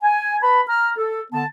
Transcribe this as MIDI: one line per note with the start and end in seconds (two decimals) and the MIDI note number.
0.03 0.38 80
0.42 0.61 71
0.42 0.61 81
0.42 0.61 83
0.68 0.91 82
0.68 0.91 89
0.96 1.19 69
1.32 1.44 50
1.32 1.44 59
1.32 1.44 81